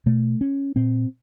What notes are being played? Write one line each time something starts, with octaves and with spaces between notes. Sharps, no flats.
B2 A3
C#4
A#2 C4